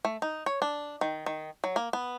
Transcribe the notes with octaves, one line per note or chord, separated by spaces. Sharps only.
A3
D#4
C#5
D4
D#3
D#3
F#3
A#3
B3